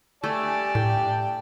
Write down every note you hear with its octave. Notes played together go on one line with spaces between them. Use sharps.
A3 G4 D5 G#5 A5
A2 G5